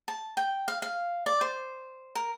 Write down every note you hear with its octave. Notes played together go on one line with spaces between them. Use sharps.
A5
G5
F5
F5
D5
C5
A#4